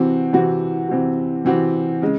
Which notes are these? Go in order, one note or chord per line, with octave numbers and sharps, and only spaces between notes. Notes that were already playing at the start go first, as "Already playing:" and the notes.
Already playing: C3 E3 C4 F#4
C3 E3 C4 F#4
C3 E3 C4 F#4
C3 E3 C4 F#4
C#3 G#3